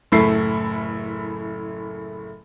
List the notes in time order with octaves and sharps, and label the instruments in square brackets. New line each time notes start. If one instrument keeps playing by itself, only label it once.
[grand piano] F#1 A2 A3 E4 A4 C7